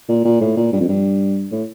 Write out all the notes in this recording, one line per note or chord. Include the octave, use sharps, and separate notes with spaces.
A#2
A#2
A2
A#2
G2
F2
G2
A2